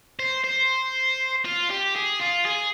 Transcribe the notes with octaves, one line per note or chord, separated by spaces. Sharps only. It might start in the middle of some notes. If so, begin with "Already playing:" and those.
C5
C5
F4
G4
G#4
F4
G#4